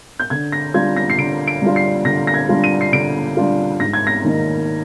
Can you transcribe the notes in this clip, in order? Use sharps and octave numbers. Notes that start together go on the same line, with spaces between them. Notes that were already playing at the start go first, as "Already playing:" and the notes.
G6
D3 G#6
A#6
G3 D4 F4 G#6
A#6
C7
D3 D7
D7
G3 D4 F4
C7
D3 A#6
A#6
G#6
G3 D4 F4
D#7
C7
D3 D7
G3 D4 F4
G#2 A#6
G#6
A#6
D#3 A#3 D#4